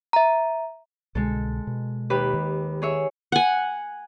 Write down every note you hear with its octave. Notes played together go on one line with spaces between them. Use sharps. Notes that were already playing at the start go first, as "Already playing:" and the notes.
E5 A#5
C2 B2 D3 G#3 A4
B2
D#2 G4 B4
D#3
G#4 C#5 E5
F#5 G#5